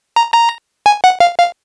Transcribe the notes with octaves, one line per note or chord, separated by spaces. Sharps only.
A#5
A#5
G#5
F#5
F5
F5